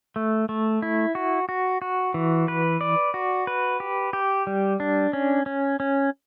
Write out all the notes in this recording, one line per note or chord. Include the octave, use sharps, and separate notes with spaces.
A3
A3
E4
F#4
F#4
F#4
E3
B4
D5
F#4
B4
G4
G4
G3
D4
C#4
C#4
C#4